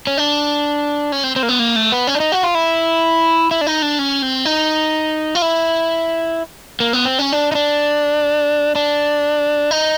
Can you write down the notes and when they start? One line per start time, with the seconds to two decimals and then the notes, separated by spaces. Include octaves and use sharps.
0.07 C#4
0.18 D4
1.12 C#4
1.24 C4
1.36 C4
1.43 A#3
1.49 B3
1.59 A#3
1.76 A3
1.92 B3
2.07 C#4
2.15 D4
2.20 D#4
2.32 F#4
2.43 F4
2.55 E4
3.51 E4
3.61 D4
3.67 D#4
3.82 D4
3.99 C#4
4.22 C4
4.45 D#4
5.35 F4
5.42 E4
6.80 A#3
6.93 B3
7.05 C4
7.19 C#4
7.33 D4
7.52 D#4
7.55 D4
8.76 D4
9.71 D#4